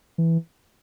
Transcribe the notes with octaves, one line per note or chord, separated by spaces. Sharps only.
E3